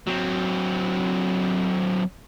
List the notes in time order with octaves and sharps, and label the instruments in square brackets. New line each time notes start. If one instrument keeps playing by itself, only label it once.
[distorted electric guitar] F#3 C4